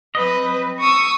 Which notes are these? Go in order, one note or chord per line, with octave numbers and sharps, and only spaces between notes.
F#3 C4 B4 D#5
C#6 D#6 E6